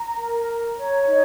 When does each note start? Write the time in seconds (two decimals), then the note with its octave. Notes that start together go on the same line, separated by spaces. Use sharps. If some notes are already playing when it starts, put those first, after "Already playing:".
Already playing: A#5
0.17 A#4
0.47 A#5
0.77 C#5
1.07 D#4